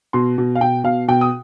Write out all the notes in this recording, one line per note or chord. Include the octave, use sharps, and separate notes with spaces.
B2 C6
B2
F5
B2 G5
B2 F5
B2 G5
D#6